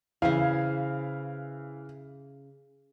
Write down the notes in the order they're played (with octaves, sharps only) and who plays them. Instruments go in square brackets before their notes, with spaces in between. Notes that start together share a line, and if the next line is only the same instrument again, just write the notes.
[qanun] C#3 C5 G#5 [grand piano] E3 [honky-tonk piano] F5